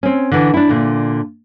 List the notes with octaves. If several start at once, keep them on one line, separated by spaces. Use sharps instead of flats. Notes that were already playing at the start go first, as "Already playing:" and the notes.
C4 C#4
D3 E3
D4 E4
A#2 D3